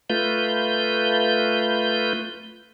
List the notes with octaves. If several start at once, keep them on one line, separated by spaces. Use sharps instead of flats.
A3 F4 B4 G6